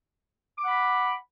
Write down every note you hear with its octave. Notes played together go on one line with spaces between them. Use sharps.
F#5 B5 D6